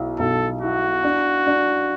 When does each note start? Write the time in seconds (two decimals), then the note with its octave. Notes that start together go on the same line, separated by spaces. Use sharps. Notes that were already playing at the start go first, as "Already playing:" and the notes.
Already playing: B1 E4
0.19 B1 A4
0.61 E4 F#4
1.03 D4
1.47 D4